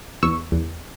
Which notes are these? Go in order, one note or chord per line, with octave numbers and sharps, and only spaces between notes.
E2 C#6 E6
E2